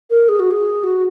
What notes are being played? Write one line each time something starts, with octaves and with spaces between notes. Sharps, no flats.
A#4
G#4
F#4
G#4
F#4